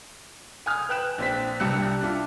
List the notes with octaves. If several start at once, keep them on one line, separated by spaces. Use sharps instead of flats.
G#5 D#6 F6
B4 G5 F#6 E7
A#1 C4 B6
C2 G2 G3 E6 F#6 C#7
D4 E4 F4